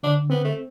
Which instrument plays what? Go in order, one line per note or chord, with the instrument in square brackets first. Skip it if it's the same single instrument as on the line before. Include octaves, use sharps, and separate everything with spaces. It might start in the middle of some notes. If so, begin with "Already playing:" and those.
[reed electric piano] D3 [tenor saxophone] D4
[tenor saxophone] B3 [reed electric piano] C4
[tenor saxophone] A3